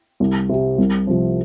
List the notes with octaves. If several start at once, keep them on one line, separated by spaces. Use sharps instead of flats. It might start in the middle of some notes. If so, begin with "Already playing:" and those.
C2
C3 G3
C2
C3 F3